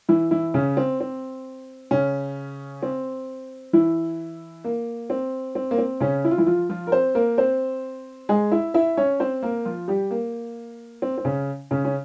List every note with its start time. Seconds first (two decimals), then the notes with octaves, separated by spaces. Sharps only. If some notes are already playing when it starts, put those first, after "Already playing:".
0.09 E3 E4
0.31 E3 E4
0.54 C#3 C#4
0.77 C4
1.00 C4
1.91 C#3 C#4
2.83 C4
3.73 E3 E4
4.64 A#3
5.10 C4
5.55 C4
5.71 A#3
5.78 C4
6.01 C#3 C#4
6.24 E4
6.31 F4
6.38 E3 E4
6.46 F3 F4
6.69 F3 F4
6.87 A#4
6.92 C4 C5
7.15 A#3 A#4
7.38 C4 C5
8.29 G#3 G#4
8.52 E4 E5
8.74 E4 E5
8.97 C#4 C#5
9.20 C4 C5
9.43 A#3 A#4
9.65 F3 F4
9.88 G3 G4
10.11 A#3
11.02 C4
11.18 C4
11.25 C#3 C#4
11.71 C#3 C#4
11.85 C#4